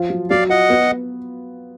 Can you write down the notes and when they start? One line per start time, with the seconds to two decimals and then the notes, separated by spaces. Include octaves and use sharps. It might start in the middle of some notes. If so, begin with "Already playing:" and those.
Already playing: F3 F4
0.10 F#3
0.30 F#3 D5 F5
0.50 F4 D#5 F#5
0.70 B3